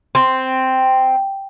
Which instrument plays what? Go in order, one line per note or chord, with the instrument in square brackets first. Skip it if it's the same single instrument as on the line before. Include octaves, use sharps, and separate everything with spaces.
[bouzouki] C4